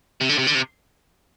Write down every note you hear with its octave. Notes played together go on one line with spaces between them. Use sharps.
C3
D3
C3
D3
C3